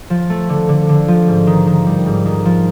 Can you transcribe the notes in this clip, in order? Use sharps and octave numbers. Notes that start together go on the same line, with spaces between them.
F3
A3
D3
D3
D3
F3
G#2
D#3
D#3
G3
G#2
D#3
F3